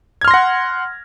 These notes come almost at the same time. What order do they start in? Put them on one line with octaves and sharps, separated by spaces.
G#6 F6 C6 A#6 F#5